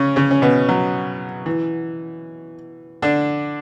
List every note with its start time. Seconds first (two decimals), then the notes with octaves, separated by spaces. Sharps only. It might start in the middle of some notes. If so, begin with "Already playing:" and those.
Already playing: C#3 C#4
0.16 C#3 C#4
0.31 C#4
0.42 B2 B3
0.69 F#3
1.46 E3
3.02 D3 D4